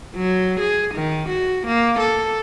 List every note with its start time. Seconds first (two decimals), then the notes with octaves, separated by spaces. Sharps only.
0.16 F#3
0.60 G#4
0.95 D#3
1.29 F#4
1.67 A#3
2.00 A4